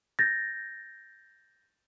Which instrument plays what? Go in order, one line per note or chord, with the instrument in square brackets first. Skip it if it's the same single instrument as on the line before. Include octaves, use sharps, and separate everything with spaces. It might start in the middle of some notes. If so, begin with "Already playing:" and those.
[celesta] G6 A6 A#6